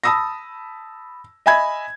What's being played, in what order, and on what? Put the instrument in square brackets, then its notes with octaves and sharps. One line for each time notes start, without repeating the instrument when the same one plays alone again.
[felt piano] A5 B5 D#6 E6 A#6
D#5 E5 G#5 B5 G#6